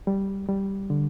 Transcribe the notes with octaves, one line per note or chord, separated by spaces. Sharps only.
G3
G3
D3